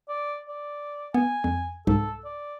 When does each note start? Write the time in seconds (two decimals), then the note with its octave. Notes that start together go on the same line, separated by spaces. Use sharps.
0.09 D5
0.48 D5
1.14 B3 G#5
1.44 F2
1.87 C2 G#2 A4
2.25 D5